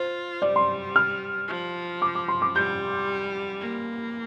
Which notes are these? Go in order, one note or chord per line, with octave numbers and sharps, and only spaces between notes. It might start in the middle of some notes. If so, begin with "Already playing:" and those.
Already playing: F4 C5
G3 D5
C6
F6
F3
D6
D6
C6
D6
G3 G6
A#3